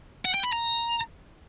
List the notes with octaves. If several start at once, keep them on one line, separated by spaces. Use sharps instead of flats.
F#5
G5
B5
A#5